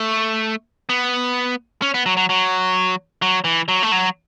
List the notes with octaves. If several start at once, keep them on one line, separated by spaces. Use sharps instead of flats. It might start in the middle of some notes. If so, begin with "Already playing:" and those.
Already playing: A3
B3
C#4
B3
F#3
F#3
F#3
F#3
E3
F#3
A3
F#3